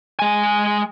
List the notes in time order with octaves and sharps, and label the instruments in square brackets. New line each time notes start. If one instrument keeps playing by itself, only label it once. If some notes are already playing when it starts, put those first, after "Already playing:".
[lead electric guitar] G#3 G#5